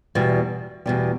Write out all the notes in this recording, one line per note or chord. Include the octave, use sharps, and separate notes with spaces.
E2 B2 G3
E2 B2 G3